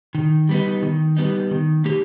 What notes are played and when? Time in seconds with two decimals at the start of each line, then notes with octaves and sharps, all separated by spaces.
0.15 D#3
0.49 G3 B3 D#4
0.82 D#3
1.17 G3 B3 D#4
1.51 D#3
1.85 A#3 D#4 G4